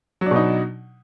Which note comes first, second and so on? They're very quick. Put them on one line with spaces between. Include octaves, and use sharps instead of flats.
F#3 D4 B2 D#4